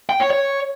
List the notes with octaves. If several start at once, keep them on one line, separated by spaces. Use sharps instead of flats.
G5
C#5
C#5